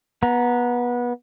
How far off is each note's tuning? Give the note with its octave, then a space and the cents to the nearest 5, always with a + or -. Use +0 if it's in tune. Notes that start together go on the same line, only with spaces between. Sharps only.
B3 -20 A#5 +0